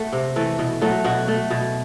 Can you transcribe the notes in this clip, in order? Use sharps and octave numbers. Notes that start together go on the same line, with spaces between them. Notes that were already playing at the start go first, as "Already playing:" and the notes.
Already playing: A3 F#4
C3
E3 A3
B2
F#3 A3
B2 F#4
A3
B2